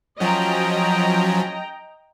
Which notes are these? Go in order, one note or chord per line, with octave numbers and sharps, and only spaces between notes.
F3 F#3 C#4 D#5 G5 A#5